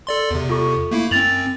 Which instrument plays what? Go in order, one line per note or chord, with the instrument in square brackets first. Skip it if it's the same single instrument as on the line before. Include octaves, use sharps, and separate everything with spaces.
[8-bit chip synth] A4 D5 C6
E2 C3
[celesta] F4 A4 C#6
[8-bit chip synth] A3 A#3 E4
[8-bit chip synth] F#2 C4 [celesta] A6 F7 F#7